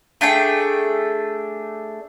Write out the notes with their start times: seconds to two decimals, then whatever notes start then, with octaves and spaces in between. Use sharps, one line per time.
0.21 A3 D4 G#4 G5